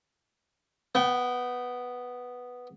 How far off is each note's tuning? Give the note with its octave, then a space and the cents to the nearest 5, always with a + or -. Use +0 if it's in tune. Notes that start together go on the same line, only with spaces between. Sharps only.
B3 +0 G5 -30